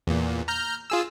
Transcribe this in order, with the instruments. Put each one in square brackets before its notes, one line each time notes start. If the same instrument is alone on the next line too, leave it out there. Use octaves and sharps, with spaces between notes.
[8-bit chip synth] E2 A#2
A#5 F6 G6
F4 G#4 E6